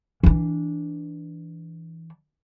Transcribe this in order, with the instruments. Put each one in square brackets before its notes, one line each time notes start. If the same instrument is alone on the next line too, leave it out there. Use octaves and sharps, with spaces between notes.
[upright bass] E3 D4